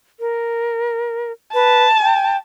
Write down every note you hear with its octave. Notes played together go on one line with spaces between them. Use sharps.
A#4
B4 A5
G5